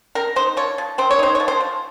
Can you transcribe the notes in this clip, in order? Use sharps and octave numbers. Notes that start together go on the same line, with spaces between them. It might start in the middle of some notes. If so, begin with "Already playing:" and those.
C4 A#4
D#4 C5
F3 C#5
F3
C4 C5
C#5
D#4 C5
F3 C#5
C5
F3